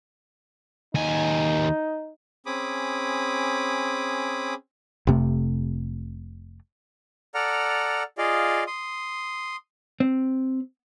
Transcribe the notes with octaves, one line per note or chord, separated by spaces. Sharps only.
D#2 D#4 G#5
C4 C#4 G#4 B5 D6 D#6
F1 C3 A3
A4 D5 F#5 A#5 F6
F4 G#4 D5 D#5 F5
C6 D#6
C4